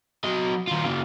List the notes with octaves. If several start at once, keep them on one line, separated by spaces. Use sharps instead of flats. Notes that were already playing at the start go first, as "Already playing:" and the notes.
F#3 D#5
D#3 F4
C#3 A#3